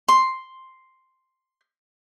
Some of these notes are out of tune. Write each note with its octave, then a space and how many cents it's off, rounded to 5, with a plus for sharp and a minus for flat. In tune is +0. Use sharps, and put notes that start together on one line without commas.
C6 +0